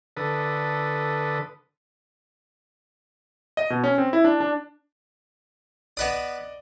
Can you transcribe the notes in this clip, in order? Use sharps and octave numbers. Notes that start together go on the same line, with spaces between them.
D3 A4 B4 D#6
D#5
B2
C#4
C4
E4
D4
D4
B3 B4 D5 D#5 D#6